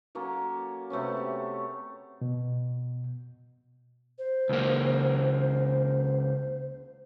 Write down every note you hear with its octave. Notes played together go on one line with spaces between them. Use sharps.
F#3 A#3 C#4 A4
C3 A3 B3 C#4
G4
B2
C5
C#2 A#3